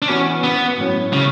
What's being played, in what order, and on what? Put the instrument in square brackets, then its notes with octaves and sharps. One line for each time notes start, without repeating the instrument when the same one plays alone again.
[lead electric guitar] D4
[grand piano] E3 B3 F#4 [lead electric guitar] C#4
[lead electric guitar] B3
[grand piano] A2 F#3 C#4
[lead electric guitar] C#3